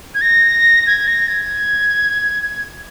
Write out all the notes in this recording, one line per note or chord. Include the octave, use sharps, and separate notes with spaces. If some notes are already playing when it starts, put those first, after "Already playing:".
G#6
A#6
G#6
A#6
G#6